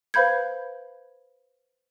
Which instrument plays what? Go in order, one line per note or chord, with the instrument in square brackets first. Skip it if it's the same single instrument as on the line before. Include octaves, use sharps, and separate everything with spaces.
[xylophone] B4 C5 F5 B5 G6 G#6